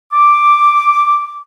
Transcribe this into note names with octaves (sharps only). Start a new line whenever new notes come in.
D6